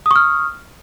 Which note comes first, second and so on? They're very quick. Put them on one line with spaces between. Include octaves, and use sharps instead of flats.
D#6 C#6 F6